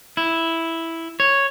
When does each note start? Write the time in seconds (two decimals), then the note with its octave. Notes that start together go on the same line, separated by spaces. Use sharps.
0.17 E4
1.20 C#5